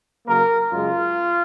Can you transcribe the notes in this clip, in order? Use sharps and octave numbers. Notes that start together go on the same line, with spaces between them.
C#3 F#3 A#3 A#4
F#2 C#3 G#3 F4